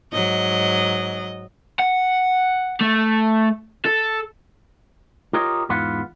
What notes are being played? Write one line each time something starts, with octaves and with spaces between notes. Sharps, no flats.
G#2 F#3 D#5
F#5
A3
A4
F4 G4 A#4 C#5 D#5
E2 G#2 F4 B4 F#5